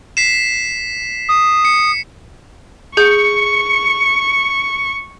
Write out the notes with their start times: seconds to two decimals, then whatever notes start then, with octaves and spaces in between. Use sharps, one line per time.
0.17 B6 C7 E7
1.29 D#6
1.65 C#7
2.97 G#4 C#6 G6 C#7